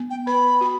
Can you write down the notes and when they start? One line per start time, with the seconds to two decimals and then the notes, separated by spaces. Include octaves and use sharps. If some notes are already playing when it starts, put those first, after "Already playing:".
Already playing: B3
0.10 G5
0.27 B4 B5
0.61 F#4